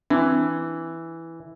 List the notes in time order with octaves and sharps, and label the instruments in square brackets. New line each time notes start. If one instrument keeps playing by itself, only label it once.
[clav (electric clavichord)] E3 [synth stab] C4 D4